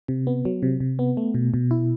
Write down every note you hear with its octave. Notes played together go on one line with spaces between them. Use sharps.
C3
B3
F#3
C3
C3
B3
A3
B2
B2
E4